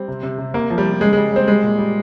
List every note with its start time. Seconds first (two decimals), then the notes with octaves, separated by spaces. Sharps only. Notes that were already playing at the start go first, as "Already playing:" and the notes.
Already playing: G3 C4
0.08 C3
0.23 C3
0.38 C3
0.54 C3 A#3
0.70 F3
0.78 G3
0.85 F3
1.01 C#3 G#3
1.13 G3 G#3
1.32 G3 C4
1.48 G3 G#3
1.63 A#2
1.79 G3